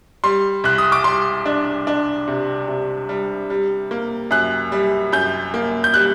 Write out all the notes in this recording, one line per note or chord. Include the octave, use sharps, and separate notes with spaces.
G3 C6
C2 F#6
D#6
D6
G3 C6
D4
D4
C3
C3
G3
G3
A#3
F#2 F#6
G3
F#2 G6
A#3
G6
G3 F#6